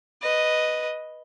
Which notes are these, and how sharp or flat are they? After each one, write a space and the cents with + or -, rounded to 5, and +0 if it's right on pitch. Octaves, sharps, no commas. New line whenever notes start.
B4 +0 D#5 +0